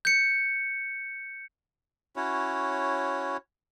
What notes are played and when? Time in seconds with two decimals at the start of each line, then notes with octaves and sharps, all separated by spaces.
0.05 G6 C#7
2.16 C#4 E4 F#4 C#5